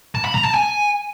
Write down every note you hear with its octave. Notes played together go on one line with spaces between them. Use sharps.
A5
B5
A#5
A5
G#5